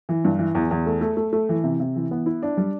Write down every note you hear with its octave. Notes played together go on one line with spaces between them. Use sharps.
E3
G2
E3
E2
E2
A3
A3
A3
A3
E3
C3
C3
E3
B3
E4
D4
G3